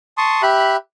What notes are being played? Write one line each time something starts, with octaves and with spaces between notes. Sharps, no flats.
A5 C6 C#6 D#6
G4 E5 B5 F#6